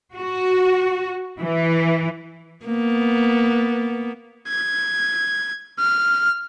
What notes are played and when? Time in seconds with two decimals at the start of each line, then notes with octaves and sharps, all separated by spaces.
0.16 F#4
1.40 E3
2.66 A#3 B3
4.48 G#6
5.80 F6